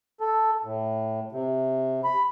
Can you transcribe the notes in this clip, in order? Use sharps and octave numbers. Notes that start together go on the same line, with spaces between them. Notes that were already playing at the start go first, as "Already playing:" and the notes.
A4
A2
C3
B5